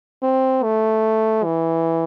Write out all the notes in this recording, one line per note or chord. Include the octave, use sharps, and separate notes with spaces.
C4
A3
E3